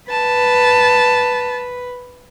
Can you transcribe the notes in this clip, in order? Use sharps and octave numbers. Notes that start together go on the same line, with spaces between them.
B4 A5